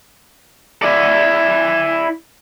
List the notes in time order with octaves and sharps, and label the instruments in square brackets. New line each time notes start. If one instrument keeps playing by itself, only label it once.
[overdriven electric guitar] E4 D5